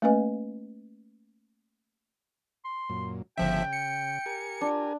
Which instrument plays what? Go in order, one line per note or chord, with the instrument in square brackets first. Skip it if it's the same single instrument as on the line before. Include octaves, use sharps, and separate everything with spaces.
[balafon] A3 A#3 C#4 B4 D#5 G#5
[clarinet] C6
[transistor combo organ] F#2 A#2
[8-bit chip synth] G1 F3 E5 [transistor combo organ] C#3 [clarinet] G5
[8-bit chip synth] C#7
[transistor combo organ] G4 A#4 G#5
[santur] D4 [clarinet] F4